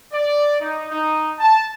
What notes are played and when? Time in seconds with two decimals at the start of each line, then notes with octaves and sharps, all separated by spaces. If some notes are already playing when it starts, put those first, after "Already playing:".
0.12 D5
0.59 D#4
0.90 D#4
1.39 A5